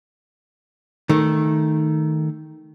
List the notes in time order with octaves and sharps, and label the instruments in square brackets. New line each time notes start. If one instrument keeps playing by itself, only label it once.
[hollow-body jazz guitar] D#3 A3